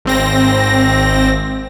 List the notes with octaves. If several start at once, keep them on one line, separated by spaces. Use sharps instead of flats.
G#1 C4 A#6